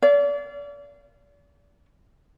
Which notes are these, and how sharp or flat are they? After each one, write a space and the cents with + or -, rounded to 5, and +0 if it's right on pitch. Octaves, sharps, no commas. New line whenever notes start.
D5 -35 F5 -30